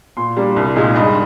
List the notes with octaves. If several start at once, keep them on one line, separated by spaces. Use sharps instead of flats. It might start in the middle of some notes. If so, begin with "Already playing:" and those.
A#2 C6
G3 A#3 D4
C2
A#2 G#3 D#4
G2 D#5